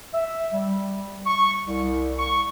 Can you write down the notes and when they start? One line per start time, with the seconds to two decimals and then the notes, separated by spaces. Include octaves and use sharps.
0.14 E5
0.53 G3
1.26 C#6
1.67 C2
2.19 C#6